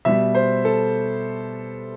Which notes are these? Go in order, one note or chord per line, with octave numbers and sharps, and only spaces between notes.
B2 G3 E5
C5
A4